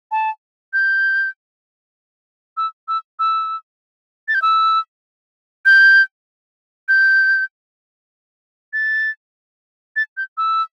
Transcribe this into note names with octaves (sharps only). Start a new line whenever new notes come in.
A5
G6
E6
E6
E6
A6
G6
E6
G6
G6
A6
A6
G6
E6